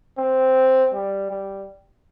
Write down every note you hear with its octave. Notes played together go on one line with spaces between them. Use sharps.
C4
G3
G3